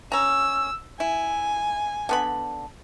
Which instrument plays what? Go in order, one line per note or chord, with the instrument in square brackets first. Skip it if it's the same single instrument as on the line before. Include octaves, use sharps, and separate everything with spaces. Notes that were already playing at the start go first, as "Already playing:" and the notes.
[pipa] C#4 A#5 [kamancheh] E6
[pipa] E4 [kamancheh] G#5
[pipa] D3 B3 B5